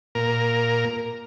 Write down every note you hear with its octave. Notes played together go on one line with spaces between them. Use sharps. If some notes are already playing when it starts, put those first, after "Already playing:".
A#2 A#4